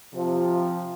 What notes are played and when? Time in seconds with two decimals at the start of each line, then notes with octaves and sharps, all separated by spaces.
0.14 C3 F3